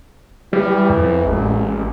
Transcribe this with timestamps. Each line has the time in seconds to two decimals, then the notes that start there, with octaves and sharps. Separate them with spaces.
0.53 E3 G3
0.90 F2
1.26 A1 G#3